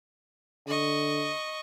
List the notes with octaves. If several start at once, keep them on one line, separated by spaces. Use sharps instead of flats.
D3 D#5 C#6